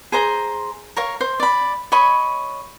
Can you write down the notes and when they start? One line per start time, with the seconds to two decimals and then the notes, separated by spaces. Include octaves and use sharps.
0.12 G#4 C5 A#5 C6
0.97 A#4 C#5 F5
1.21 C5
1.40 D5 B5
1.92 C#5 D#5 B5 C#6